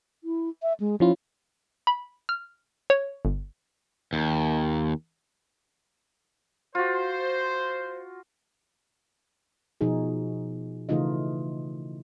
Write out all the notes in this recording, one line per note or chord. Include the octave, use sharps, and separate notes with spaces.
E4
E5
G#3
F3 C#4 E4 F4
B5
F6
C#5
G1
D#2
F4 F#4 C5
B2 F3 D#4 F#4 G#4
C#3 E3 A3 D#4 F4 D#5